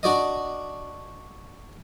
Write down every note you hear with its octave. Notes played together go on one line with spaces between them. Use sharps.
D4 F#4 D5 D#5